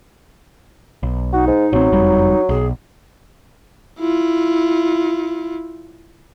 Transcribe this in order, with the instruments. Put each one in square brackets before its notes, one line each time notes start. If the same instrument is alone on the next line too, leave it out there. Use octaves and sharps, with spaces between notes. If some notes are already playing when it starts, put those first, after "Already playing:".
[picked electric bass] B1
[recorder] D#4 [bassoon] F#4
[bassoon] G#2
[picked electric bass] A1 C4 [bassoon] F#3
[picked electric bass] F#1 F2 G3
[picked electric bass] B1 [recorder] G#4
[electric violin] E4 F4